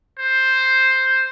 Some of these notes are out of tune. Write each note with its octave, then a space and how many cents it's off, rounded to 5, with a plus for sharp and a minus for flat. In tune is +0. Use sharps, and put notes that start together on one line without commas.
C5 +5